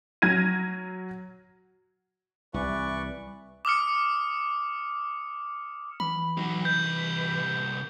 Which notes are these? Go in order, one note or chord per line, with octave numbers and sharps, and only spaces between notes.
F#3 F6 G#6 A#6 D#7
C2 E3 B4 D5 C#6
D6 D#6 F6 C#7
E3 B5
F#3 D#4
C2 B4 G6